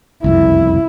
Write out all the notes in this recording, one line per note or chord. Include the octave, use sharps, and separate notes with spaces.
F#1 C2 F2 E4